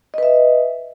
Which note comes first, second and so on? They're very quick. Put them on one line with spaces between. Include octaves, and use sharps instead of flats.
D#5 B4 E5